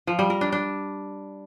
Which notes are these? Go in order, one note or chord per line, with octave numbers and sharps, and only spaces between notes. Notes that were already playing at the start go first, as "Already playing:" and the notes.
F3
G3
A#4
D4
D4